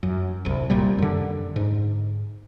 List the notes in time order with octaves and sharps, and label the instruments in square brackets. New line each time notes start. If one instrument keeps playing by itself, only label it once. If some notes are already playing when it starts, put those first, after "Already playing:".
[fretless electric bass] F#2
D1 C2
D1 C2 A#2 G3
F#2 D3
G#2